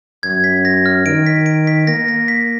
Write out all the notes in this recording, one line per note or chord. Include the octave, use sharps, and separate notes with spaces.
F#2 G#6
B6
A#6
F6
D#3 D7
B6
D7
B6
A#3 A#6
A#6
B6